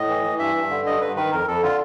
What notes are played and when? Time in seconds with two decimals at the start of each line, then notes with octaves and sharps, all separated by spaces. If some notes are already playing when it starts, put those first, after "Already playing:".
Already playing: A2 D#5
0.08 E3
0.24 E3
0.39 G2 E5
0.55 G2
0.70 D3
0.86 G2 D#5
1.01 G2 B4
1.16 D#3 B4
1.32 F2 A#4
1.47 F2 A4
1.62 D3 F4